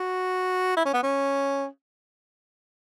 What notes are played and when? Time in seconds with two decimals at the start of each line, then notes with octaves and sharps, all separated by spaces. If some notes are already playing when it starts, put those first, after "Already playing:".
Already playing: F#4
0.77 E4
0.86 C#4
0.94 B3
1.03 C#4